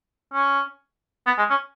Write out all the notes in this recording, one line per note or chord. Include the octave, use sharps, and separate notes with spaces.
C#4
B3
G#3
C#4